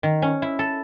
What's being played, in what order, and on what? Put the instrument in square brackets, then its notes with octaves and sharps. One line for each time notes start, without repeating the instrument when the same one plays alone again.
[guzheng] D#3
C#4
E4
A4